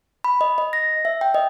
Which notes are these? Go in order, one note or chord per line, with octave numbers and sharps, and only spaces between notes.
B5
D#5
D#5
A#6
E5
G5
D#5